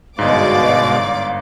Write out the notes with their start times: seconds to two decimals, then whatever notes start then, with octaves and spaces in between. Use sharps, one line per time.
0.19 G1 G#2 B2 G#3 D5 F5 D6